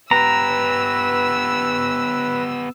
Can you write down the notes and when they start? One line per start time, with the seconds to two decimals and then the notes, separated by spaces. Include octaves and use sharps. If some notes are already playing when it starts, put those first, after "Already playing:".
0.11 B3 G4 B4 A#5 E6